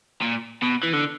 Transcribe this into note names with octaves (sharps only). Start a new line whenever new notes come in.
A#2
B2
E3
D3